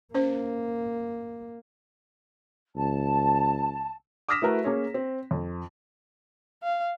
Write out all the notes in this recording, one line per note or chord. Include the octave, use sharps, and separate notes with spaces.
A#3 C#4 C5
C#2 A5
D6 D#6 F6 A#6 B6 E7
A3 E4 F#4 A#4 B4
A#3 C#4 G#4 C#5
C4
F2
F5